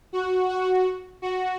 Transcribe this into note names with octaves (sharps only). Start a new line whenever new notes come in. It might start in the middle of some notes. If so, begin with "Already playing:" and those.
F#4
F#4
F#4